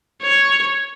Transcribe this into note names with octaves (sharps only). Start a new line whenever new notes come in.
C#5